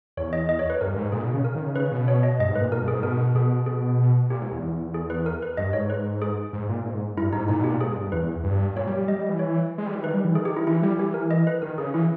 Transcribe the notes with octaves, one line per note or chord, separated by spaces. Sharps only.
E2 C#5
D#5
D#5
C#5
B4
G2 A#4
G#2
A#2 G#4
B2
C#3
A#4
D#3
C#3
C#3 B4
B2
C#5
D#5
G2 D#5
G#2
B4
A#2
B2 A#4
G2
G#2 G#4
B2 A#4
B2 G#4
B2 G#4
A#2 G4
G#2
E2
E2
G#4
B4
A#4
B4
G2 D#5
G#2 C#5
B4
G#4
G#2
A#2
G#2
G2 E4
G#2 D#4
A#2 D#4
B2
G4
A#2
G#2 G#4
G2
G2
E2 B4
G2
A#2 C#5
G3
G3
G3 D#5
G3
E3
C#5
G#3
G3
E3
D#3 B4
G3
E3
D#3 G#4
G4
E4
E3 E4
G3 G4
E3 G4
A#4
D#5
B4
D#3 A#4
C#3 G#4
E3 E4